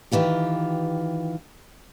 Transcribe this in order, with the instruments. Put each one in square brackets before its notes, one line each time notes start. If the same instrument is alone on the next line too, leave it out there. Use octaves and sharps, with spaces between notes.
[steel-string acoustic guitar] D#3 E3 F4 G4